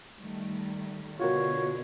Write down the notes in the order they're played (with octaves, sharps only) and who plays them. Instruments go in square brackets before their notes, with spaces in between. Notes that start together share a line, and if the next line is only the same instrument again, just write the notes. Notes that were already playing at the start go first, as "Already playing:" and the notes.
[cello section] D#3 G3 A3
[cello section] B2 D3 [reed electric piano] F4 F#4 A#4 [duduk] C#5